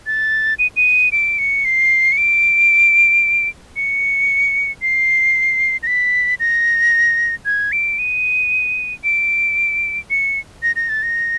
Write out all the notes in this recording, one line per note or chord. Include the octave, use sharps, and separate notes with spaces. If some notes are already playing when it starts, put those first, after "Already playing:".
A6
D#7
D#7
D7
C#7
C7
C#7
D7
C#7
C7
A#6
B6
A#6
G#6
D7
D#7
D7
C#7
A#6
A#6
A6
A#6